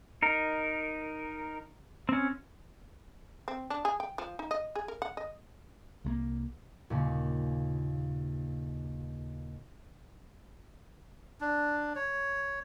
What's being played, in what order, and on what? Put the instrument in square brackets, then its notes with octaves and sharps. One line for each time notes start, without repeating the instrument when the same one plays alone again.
[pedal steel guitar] D#4 A#4
C4 C#4
[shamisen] C4
D4
G#4
G5
F3
D#4
D#5
G#4
A#4
F#5
D#5
[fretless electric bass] C2 G#3 A#3
[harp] D#2 A#2 C#3
[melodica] D4
C#5